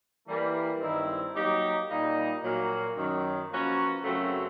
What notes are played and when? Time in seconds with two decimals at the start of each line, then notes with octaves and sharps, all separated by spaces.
0.28 E3 G3 A#3
0.81 G2 D#3 G#3 C4 E4
1.35 F#3 A#3 D#4 G4
1.89 A#2 G3 A#3 D#4
2.43 A#2 F#3 A#3
2.96 F#2 D#3 F#3
3.50 F3 A#3 C#4 F#4 B4
4.04 F#2 C#3 F#3 A3 C4